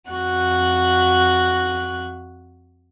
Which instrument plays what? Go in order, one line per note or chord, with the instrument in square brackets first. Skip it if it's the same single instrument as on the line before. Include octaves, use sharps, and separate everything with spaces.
[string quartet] F2 F#4 F#6